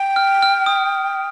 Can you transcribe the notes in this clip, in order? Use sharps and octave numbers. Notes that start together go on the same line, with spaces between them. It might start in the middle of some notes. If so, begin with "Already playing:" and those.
Already playing: G5
F6
F6
D#6